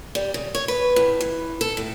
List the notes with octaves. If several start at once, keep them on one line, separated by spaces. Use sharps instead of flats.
G3
C#3
C#5
B4
A2
E3
A4
A2